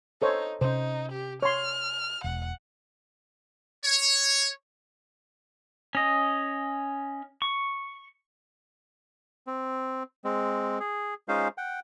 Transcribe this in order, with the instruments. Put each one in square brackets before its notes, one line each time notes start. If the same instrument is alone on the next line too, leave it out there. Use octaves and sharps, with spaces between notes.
[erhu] D#4 [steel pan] A4 C5 C#5
[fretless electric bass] C3 C#4 [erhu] D#4 [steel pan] C5
[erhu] G4
[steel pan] C#5 C6 [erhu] F6
[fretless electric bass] E1 [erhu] F#5
[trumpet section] C#5
[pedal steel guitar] C#4 D#5
C#6
[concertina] C4
G#3 C4
G#4
G#3 C#4 D#4 F4 C5 F5
F#5 G5